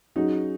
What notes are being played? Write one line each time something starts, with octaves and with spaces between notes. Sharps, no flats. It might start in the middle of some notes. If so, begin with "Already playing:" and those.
F#3 C#4 D#4 F#4 G#4